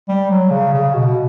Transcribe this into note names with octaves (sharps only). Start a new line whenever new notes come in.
G3
F#3
C#3
C#3
B2